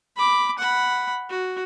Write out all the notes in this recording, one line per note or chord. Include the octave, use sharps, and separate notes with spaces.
B5 D6
F#5 B5
F#4